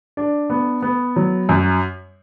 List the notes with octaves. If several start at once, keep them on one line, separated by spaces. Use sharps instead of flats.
D4
B3
B3
F#3
F#2